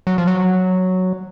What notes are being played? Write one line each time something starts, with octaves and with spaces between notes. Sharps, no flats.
F#3
F3
F#3